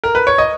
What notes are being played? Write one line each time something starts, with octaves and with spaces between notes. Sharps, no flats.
A#4
B4
C#5
D#5